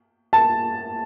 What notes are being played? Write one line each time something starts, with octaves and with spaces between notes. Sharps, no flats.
A5